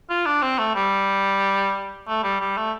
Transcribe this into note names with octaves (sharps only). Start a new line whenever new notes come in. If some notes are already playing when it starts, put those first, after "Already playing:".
F4
D4
C4
A3
G3
A3
G3
G3
A3